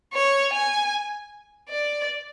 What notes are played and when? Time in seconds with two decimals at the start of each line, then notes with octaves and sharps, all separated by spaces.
0.14 C#5
0.53 G#5
1.69 D5